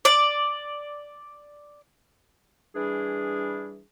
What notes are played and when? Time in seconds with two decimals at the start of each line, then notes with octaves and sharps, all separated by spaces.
0.05 D5 D6
2.75 E3 G3 D4 G#4